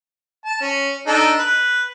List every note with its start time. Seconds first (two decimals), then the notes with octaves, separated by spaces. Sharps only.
0.46 A5
0.61 C#4
1.07 D4 D#4 A4
1.38 B4